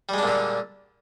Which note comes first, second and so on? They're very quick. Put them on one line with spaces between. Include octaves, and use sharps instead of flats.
G3 G#3 D4 A#2 D3